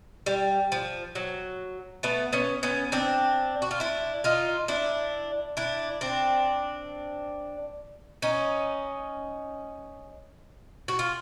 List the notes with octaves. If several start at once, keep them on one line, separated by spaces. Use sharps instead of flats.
G3
F3
F#3
A3 B3
B3 C#4
B3 C#4
C4 D4
F#4
F4
D4 E4
D#4 F4
D4 E4
D4 E4
C4 D4
C#4 D#4
F#4
F4